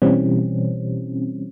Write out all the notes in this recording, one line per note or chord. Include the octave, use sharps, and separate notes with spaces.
B2 E3 G3 C4 C#4